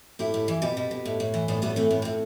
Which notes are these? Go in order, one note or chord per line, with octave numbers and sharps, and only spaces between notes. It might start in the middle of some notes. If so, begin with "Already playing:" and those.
A2 E4 G4
A2
E3
B2 G4 B4
B2
B2
A2
A2
E3
A2 B3 D4
A2 G3 B3
E3 A3 C4
A2 B3
A2 C4